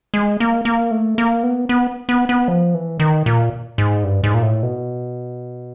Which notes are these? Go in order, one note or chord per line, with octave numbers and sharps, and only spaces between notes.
G#3
A#3
A#3
A3
A#3
B3
B3
B3
B3
F3
E3
D#3
A#2
G#2
G2
G#2
A#2
A2
B2